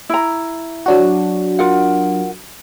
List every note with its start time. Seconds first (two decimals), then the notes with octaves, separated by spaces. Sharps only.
0.09 E4 A#5
0.86 F#3 D4 F#4
1.59 F4 A#4 F#5